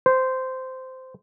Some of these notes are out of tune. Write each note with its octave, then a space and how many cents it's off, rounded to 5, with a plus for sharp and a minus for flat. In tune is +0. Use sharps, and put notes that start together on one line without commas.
C5 -15